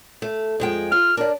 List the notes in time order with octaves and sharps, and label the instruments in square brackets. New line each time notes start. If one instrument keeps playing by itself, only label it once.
[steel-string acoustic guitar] A3
F2 G#3 G5
[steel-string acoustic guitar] F4 [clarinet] F6
[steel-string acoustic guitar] D4 D5 [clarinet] A#4